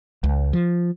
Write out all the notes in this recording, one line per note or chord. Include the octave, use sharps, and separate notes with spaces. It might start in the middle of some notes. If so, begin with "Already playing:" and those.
C#2
F3